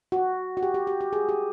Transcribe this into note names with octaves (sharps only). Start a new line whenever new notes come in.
F#4
F#4
G4
G4
G4
G4
G#4
G4